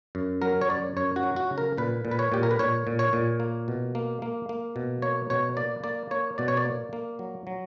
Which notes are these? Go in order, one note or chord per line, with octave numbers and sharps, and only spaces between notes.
F#2
F#3 A#4
C#5
F#2 D5
F#2 C#5
F#4
F#3
F#4
C#3
A#4
A#2 B4
A#2
B4
C#5
A#2 G4
A#4
B4
A#2 C#5
A#2
C#5
A#2
A#3
B2
A#3
A#3
A#3
B2
A#3 C#5
B2 C#5
A#3 D5
A#3 D5
A#3 C#5
B2 D5
C#5
D5
A#3
A#3
F#3
F#3